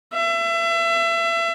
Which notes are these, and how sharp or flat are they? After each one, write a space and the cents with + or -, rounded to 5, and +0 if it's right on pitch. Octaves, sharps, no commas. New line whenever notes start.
E5 +30